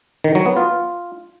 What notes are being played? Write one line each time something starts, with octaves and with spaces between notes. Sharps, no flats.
D#3
F#3
B3
F4